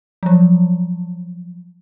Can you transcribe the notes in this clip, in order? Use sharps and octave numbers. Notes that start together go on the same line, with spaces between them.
F3 F#3